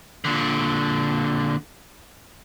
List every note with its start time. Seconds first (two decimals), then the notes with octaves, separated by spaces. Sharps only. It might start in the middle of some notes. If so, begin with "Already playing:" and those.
0.25 A#2 D3